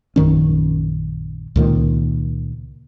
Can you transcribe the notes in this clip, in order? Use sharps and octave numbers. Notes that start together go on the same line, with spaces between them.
A#1 F#2 D#3 C#4
C#2 A#2 D#3